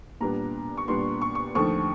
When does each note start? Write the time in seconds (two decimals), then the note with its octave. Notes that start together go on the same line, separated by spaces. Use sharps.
0.21 A#2 G3 B3 D4 A#5
0.77 C#6
0.88 A#2 G3 B3 D4 C6
1.22 C#6
1.35 C#6
1.55 D#2 D3 F3 A3 C#6